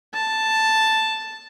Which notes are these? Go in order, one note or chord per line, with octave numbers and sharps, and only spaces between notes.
A5